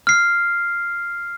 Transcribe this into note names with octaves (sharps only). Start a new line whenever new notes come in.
F6 C7